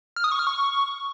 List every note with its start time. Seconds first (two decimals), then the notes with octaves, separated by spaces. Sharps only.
0.16 F6
0.24 D#6
0.32 C#6
0.39 F6
0.47 C#6